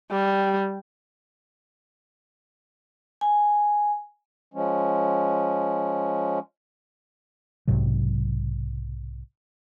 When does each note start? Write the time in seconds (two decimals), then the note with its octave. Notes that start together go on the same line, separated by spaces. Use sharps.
0.11 G3
3.21 G#5
4.54 F3 G#3 C#4
7.68 B1 G#2 C3 F#3